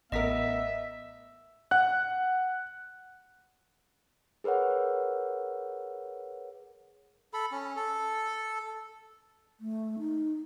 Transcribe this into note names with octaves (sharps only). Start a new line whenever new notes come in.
A1 B3 A#4 D#5 E5 B6
F#5 F#6
G#4 A#4 B4 C#5 F#5
A4 B5
C#4
A4
A3
D#4